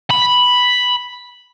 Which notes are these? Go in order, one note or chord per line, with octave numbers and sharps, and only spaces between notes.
B5